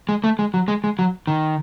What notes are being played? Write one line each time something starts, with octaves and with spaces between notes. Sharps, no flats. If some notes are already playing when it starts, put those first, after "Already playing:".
G#3
A3
G#3
F#3
G#3
G#3
F#3
D#3